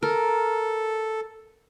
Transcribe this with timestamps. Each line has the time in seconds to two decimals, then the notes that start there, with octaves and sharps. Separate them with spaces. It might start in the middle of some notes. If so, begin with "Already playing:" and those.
0.03 A4 A#4